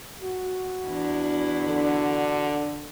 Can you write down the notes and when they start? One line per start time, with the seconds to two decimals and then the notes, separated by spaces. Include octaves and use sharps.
0.22 F#4
0.87 E2 D4 E4
1.65 D3